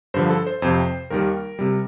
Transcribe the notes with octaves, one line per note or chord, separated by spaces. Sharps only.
G2 D3 F3 C5
A4
C5
F2 C3 F3 C5
D#2 D#3 G3 A#4
C3 G3